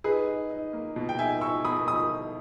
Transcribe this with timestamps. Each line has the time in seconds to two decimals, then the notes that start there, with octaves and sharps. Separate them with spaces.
0.04 D#4 G#4 B4
0.27 D#4
0.50 D#4
0.73 A#3
0.96 B2
1.09 G5
1.19 D#4 E5 G#5
1.41 D#4 C#6 E6
1.65 B2 B5 D#6
1.87 D#4 B5 D#6